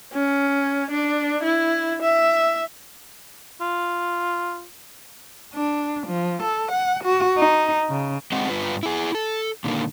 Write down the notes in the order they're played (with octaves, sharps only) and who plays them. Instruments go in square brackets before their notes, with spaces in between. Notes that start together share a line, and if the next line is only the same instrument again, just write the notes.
[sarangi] C#4
D4
E4
E5
[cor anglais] F4
[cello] D4
F3
A4
F#5
F#4
D#4
C#3
[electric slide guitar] G#3 C4 G#4 C5 D#5 F#5
G2 F4 B4
E4 G#4
A4
A#2 D3 D#3 A#3